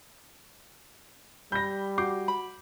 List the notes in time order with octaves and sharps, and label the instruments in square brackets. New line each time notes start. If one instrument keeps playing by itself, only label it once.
[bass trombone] G3 [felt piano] B5 [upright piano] G6 A#6
[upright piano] F#4 [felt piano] D6 G6 C7
[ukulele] B5